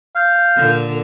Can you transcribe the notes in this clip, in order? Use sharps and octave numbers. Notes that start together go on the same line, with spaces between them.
F5 G6
A#2 D3